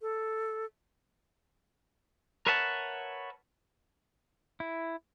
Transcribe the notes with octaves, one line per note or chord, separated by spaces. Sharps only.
A4
A#4 B4 C#5 E5 F#5 A5
E4